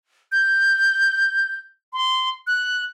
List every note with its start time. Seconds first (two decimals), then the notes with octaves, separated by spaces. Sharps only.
0.32 G6
1.93 C6
2.47 F#6